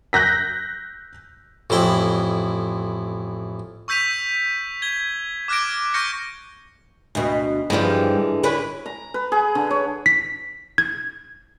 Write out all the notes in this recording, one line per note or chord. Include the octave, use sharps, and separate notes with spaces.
F#6 G6 A#6 B6
A1 F2 E4 G5
C#6 E6 G6 B6 D#7 F7
G#6 G7
D6 F6 F#6 G#6 A#6 D7
C#6 F6 G6 A#6 C#7
D2 B2
G2 D3 E3 F3 G#3
D3 C#4 B4
A#5
B4
G#4
D3
C#5
B6
G#6